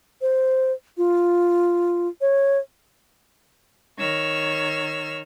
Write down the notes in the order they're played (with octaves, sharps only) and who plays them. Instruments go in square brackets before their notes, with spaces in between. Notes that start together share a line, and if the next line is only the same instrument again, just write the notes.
[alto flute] C5
F4
C#5
[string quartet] D#3 C#5 E6 F6